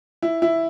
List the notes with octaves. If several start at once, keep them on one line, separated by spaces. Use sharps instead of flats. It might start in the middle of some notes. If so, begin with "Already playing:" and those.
E4
E4